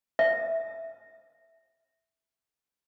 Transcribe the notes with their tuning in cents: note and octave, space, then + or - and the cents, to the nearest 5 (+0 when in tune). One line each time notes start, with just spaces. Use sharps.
E5 -5